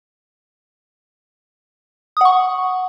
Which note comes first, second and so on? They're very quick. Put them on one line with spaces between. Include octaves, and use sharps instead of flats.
D#6 F#5 C#6